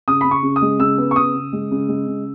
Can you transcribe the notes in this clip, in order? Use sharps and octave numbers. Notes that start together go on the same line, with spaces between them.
C#3 D#6
C#3 B5
C#6
C#3
D#6
G#3
C#3 E6
B3
C#6
C#3 D#6
C#3
G#3
C#3
G#3
C#3